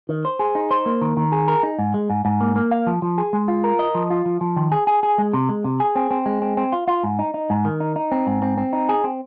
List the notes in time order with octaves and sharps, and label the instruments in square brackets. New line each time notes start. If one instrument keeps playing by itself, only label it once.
[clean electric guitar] D#3
C5
G#4
D#4
C5
A#3
D#3
D#3
G#4
A#4
D#4
G#2
G#3
G#2
G#2
A#3
A#3
F5
F3
F3
G#4
G#3
F4
A#4
D#5
F3
F4
F3
F3
D#3
G#4
G#4
G#4
G#3
C3
G#3
C3
G#4
C4
C4
G#3
C4
C4
F4
F4
G#2
D#4
D#4
G#2
D#3
D#4
D#4
C4
G#2
C4
C4
D#4
G#4
C4